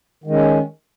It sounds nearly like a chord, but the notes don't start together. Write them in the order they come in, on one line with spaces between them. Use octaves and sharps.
D#3 G#3 C#4